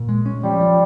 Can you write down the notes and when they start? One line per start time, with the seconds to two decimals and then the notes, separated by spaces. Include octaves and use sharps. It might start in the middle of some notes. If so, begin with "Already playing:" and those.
Already playing: A#2
0.09 G#3
0.26 C#4
0.44 F3 G3
0.61 F3